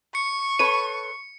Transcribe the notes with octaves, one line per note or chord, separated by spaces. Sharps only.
C#6 C#7
A4 B4 C#5 D#7